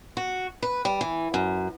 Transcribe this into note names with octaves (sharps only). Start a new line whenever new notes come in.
F#4
B4
G3
E3
F#2